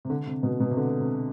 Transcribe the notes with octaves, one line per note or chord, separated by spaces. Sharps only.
C3
D3
C3
B2
B2
C3
D3
C3